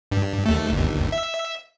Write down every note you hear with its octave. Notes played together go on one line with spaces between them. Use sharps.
G2
D#2 A3
G1 D#2
E5